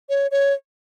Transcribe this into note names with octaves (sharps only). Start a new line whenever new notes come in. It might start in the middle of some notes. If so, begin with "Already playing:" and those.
C#5
C#5